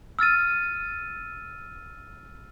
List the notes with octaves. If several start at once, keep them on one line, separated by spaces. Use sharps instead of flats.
E6 F6 A6 D#7